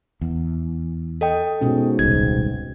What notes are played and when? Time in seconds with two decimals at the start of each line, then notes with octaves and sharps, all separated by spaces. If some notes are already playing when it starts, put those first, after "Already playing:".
0.21 E2
1.21 A4 D#5 G5
1.61 G#2 B2 C#4
1.99 D#1 C2 G#6